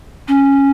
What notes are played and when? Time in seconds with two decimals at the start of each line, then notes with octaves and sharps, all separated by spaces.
0.28 C#4